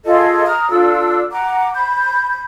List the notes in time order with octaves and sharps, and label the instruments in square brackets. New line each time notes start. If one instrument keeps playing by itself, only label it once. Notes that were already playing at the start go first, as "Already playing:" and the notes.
[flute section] F4 G#4 A4 D#5
A#5 D#6 F6
D4 F4 A4 E6
F#5 A#5 D6
B5 G6